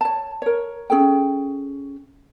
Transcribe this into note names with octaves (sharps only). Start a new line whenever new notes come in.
C#5 A5
A#4 C#5
C#4 G#4 A4 G5